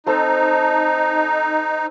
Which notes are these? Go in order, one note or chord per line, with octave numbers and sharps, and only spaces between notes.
C4 D#4 A4 C5